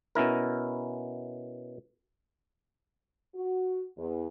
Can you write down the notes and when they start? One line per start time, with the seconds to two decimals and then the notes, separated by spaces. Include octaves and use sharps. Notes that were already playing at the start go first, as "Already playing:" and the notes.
0.15 B2 C#4 E4 A#4
3.32 F#4
3.96 E2